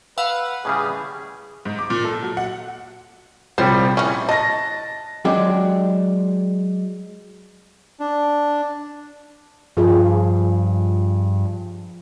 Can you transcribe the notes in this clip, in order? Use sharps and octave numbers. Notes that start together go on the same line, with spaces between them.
B4 F5 F#5 E6
A2 C#3 G3 G#4
G#2
D6
A#2
A4
F#3
F#5
A#1 C3 G3 C5 C#5
E3 C#4 C#6
D#5 A5 A#6
F#3 G#3 D4 G4
D4
G2 F3 F4 G#4